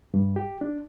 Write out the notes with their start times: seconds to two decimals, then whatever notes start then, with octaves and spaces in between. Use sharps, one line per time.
0.14 G2
0.36 G4
0.61 D4